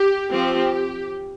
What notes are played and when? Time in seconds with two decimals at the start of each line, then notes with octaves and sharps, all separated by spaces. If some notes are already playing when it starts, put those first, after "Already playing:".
Already playing: G4
0.32 F3 C4 G4